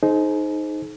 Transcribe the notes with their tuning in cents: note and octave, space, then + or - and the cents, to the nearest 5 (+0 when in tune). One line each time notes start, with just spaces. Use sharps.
D#4 +0 G#4 +40 C5 +0